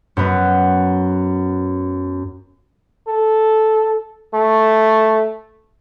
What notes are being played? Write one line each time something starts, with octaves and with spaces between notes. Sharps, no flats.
F#2 B3
A4
A3